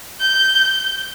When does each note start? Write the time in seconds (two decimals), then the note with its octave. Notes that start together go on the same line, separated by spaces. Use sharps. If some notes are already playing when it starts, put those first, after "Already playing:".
0.20 G6